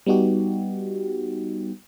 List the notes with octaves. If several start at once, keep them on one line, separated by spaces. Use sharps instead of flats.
G3 B3 D#4 F#4 G4